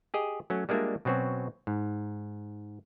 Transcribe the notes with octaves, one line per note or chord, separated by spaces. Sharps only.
G4 G#4 D#5
F#3 A3 C#4
G3 G#3 A#3 D4 F4 E5
B2 F#3 C4 C#4 F#4
G#2